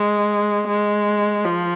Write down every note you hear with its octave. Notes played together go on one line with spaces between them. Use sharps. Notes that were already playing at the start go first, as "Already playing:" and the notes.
Already playing: G#3
G#3
F3